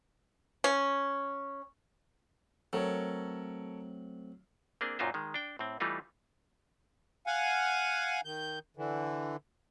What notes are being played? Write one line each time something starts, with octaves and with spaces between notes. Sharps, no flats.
C#4
F#3 A3 C4 A4 A#4 C#5
A#3 C4 D4 G#4
F#2 A#2 F#3 D#4 F4 C5
D#3 G#3
D4 G5
A2 C4
E3 G3 A3 D#4 F4
F5 F#5 G#5
D#3 G6
D3 E3